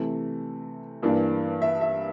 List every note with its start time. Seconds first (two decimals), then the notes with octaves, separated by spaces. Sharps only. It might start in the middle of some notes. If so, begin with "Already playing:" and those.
Already playing: C3 E3 A3
1.03 G2 E3 A#3 D4
1.62 E5
1.81 E5